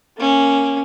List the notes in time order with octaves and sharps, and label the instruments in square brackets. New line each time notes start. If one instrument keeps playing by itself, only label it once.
[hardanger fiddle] A#3 C#4